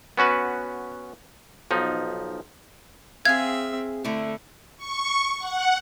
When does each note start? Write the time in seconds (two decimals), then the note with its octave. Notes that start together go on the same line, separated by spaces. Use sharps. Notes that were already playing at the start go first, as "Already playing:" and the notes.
0.18 B3 C#4 F#4 B4
1.71 B1 F3 D#4
3.25 C4 G#4 E5 F5 G#6
4.04 D3 A3 E4
4.77 C#6
5.39 F#5